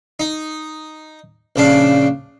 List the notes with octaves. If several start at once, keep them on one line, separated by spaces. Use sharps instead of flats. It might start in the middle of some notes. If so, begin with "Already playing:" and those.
D#4
A#1 C#3 D4 F5